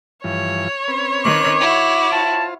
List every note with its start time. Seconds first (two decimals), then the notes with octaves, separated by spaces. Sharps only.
0.24 G2 E3 F3 C#5
0.88 C4 C#4 B4
1.24 D#3 D6 F#6
1.60 E4 F#4
2.12 F4 C5 A5